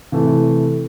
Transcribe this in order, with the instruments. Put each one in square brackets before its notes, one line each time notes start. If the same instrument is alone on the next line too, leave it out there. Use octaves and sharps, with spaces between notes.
[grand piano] C3 E3 A3